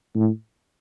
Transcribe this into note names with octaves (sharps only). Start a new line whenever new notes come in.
A2